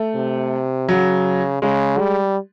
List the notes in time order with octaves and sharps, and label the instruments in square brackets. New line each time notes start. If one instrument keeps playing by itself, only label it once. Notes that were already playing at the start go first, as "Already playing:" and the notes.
Already playing: [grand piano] A3
[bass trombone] C3
[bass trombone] C#3 [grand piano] F#3
[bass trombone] C#3 [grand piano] G#3
[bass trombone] G3